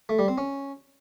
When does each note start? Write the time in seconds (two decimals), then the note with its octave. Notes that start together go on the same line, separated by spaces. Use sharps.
0.09 A3
0.19 G3
0.28 C4
0.38 C#4